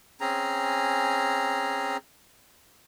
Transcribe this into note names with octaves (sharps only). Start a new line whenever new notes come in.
C4 C#4 G#4 A#5